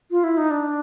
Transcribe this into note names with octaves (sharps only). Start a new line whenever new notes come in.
F4
E4
D#4
D4